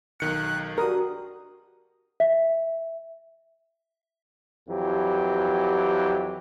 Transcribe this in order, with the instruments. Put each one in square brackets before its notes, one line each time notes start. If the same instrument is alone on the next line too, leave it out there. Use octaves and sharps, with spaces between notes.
[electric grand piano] B1 D#3 C#7 [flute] F#6
[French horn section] D4 F#4 G4 [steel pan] A#4 [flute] D#6
[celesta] E5
[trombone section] F2 E3 F#3 G4